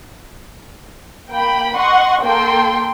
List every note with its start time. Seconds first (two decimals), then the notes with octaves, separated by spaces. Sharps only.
1.31 A#3 G5 B5
1.77 D#5 F#5 C6 C#6
2.24 A#3 A4 G5 C6